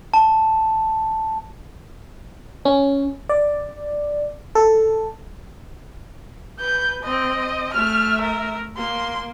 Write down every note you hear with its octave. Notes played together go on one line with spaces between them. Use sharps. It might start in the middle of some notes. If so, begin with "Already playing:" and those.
A5
C#4
D5
A4
B4 G6
C4 D#5
A3 E5 F6
A#4
A#3 C6